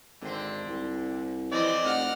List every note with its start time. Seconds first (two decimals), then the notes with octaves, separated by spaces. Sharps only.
0.21 G#1 D3 C4
0.67 C2
1.52 F2 E3 C4 D5 D#5
1.84 F1 F#5 F6